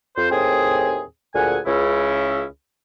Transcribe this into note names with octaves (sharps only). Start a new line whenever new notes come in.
F2 C5
D#2 A2 C4 G#4
D2 A#2 G#4 F#5 G#5
C#2 C#3 E4